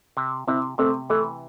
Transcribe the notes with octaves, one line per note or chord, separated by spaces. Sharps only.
C3
C3 C4 E4
C3 A3 C4
E3 A3